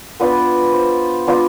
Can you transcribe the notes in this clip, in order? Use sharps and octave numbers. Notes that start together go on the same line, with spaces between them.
B3 D4 F4 B4
C5
B3 D4 F4